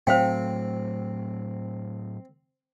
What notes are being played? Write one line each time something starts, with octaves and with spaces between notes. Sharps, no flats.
A2 F#3 A3 C4 C5 F5 G5